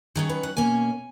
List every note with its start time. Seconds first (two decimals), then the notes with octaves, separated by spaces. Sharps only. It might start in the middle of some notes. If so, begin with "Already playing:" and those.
0.15 D#3 F#3 C#4 G#4
0.29 B4
0.43 F#5
0.57 B2 A#3 C#4 G#5